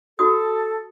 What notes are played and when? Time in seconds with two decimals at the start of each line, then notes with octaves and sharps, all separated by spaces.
0.19 F#4 A4 D#6